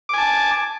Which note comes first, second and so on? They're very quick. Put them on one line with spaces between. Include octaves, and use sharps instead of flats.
D6 G#5 A5